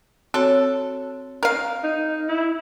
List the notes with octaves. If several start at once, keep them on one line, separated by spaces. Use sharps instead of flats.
C4 F#4 A4 C#5
A#4 F5
D#4
E4